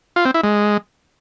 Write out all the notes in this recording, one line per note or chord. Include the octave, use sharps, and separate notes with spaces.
F4
C4
E4
G#3